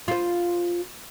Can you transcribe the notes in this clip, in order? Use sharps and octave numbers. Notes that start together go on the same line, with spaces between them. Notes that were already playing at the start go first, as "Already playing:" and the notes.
F4 C5